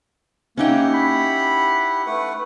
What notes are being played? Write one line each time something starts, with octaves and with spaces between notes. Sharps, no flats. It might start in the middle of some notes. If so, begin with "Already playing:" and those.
A#3 C#4 D#4 E4 G4 F#5 G5
B5
A3 B4 F#5